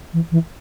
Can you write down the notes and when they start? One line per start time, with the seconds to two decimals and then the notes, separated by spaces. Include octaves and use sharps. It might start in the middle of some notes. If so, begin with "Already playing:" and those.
0.13 E3
0.31 E3